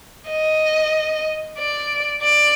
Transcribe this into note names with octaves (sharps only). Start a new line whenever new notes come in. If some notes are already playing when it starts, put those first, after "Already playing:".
D#5
D5
D5